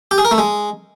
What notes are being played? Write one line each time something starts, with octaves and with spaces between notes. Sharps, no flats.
G4
G#4
A#4
A3
G#3